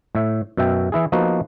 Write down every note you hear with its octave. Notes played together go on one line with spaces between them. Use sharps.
A2 E5
F#2 B2 E5 G5
E3 E4 G#4
F3 A#3 B3 D#4 F#4